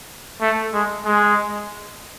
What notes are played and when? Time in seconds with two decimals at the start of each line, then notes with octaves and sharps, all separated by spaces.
0.41 A3
0.74 G#3
1.05 G#3